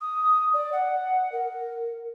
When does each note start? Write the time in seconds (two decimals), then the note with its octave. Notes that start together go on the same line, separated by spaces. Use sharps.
0.01 D#6
0.53 D5
0.72 F#5
1.32 A#4